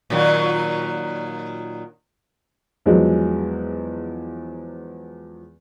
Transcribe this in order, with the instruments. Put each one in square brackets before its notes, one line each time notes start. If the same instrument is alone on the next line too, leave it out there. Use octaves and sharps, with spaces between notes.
[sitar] A#2 D#3 F#3
[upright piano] E2 F3 F#3 G#3